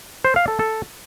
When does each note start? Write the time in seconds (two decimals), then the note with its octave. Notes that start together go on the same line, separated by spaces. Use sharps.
0.25 C5
0.36 F5
0.48 A4
0.59 A4